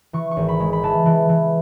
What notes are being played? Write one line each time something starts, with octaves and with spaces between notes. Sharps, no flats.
E3 C#6
C#6
G#1
B5
G#3
B5
E3 A5
E3
E3